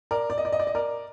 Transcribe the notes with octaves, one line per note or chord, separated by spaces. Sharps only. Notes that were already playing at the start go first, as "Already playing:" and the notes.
A#4 D5
D5
D#5
D5
D#5
D5
D#5
A#4 D5